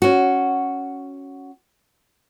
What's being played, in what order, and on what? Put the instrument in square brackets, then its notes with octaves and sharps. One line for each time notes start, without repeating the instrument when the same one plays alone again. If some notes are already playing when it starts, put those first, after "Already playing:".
[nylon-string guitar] C#4 F#4